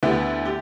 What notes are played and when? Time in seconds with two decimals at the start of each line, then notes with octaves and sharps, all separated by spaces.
0.03 D2 D3 B3 E4 G4
0.45 G4